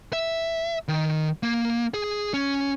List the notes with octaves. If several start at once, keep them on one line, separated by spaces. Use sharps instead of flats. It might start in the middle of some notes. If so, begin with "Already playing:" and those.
E5
D#3
A#3
G#4
C#4